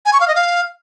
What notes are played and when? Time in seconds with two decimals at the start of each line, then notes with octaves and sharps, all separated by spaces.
0.06 G#5
0.13 C#6
0.20 F5
0.28 D#5
0.35 F5